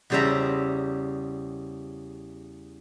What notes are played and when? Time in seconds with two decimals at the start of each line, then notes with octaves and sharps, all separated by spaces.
0.10 E2 C#3 G3 C5 E5 A#5